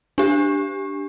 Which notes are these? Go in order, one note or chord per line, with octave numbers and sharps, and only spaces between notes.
D4 G4